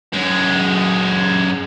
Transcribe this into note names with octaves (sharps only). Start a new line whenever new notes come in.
F#2 G#3